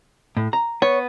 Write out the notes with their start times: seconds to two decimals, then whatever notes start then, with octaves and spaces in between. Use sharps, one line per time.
0.37 A2
0.53 A#5
0.82 B3 C#5